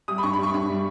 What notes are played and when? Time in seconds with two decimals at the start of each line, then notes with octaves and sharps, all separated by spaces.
0.08 G3 D#6
0.18 B5
0.23 G2 C#6
0.33 B5
0.38 G3 C#6
0.54 G2 B5
0.69 G3